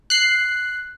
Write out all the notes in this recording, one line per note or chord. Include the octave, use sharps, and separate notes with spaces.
F#6 C7